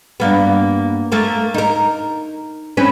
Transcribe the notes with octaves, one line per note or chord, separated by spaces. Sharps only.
G2 A#3 B3
A3 A#3 A#4
D#4 A#4
C4 C#4 B4